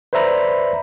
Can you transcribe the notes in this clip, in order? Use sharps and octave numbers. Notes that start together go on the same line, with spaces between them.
B4 C5 D5 E5 A#5 B5